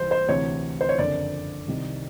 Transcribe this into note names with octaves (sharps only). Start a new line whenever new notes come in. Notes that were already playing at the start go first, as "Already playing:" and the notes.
Already playing: C2 C3 E3 C5
C5
D2 C3 E3 C#5
C5
C#5
F#1 F2 D3 D5
C2 C3 D#3